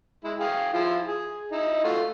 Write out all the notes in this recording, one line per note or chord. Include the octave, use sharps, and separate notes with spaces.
G#3 E4
G#4 F5 G5
F3 E4 F4
G#4
D#4 E4 D#5
A3 F4 F#4